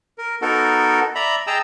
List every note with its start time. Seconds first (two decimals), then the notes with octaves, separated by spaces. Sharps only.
0.18 A#4
0.42 B3 D#4 F#4 A4 A#4
1.15 D5 E5 A#5 B5
1.47 G#4 D#5 G5 A5 A#5 E6